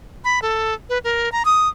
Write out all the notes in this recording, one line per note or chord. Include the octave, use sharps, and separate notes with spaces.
B5
A4
B4
A#4
A#5
D#6